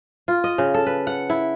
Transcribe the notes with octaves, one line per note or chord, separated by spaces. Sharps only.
F4
D#5
C#3
A4
B4
F#5
E4